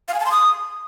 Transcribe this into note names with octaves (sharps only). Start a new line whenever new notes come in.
F5
G#5
A5
C6
D#6